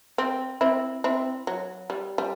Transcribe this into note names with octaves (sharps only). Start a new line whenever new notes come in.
C4
C4 E4
C4 E4
F#3
G3
G3